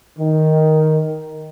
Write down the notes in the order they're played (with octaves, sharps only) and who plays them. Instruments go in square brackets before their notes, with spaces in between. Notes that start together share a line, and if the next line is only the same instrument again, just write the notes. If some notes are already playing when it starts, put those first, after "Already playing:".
[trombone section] D#3